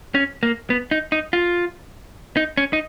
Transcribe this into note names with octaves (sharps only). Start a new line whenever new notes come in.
C#4
A#3
B3
D#4
D#4
F4
D#4
C#4
D#4